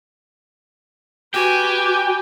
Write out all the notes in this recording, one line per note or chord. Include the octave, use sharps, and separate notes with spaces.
F#4 G4 B4 G#5 D6